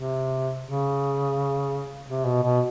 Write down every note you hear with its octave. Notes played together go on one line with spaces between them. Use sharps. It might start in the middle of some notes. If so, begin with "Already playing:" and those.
Already playing: C3
C#3
C3
B2
B2